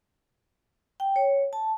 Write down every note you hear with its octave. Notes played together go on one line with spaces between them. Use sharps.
G5
C#5
A5